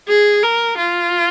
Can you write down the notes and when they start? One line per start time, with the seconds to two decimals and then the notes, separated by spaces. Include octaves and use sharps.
0.08 G#4
0.43 A#4
0.78 F4